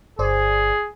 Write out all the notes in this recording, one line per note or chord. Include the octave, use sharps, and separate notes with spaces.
G1 G#4 C5 D5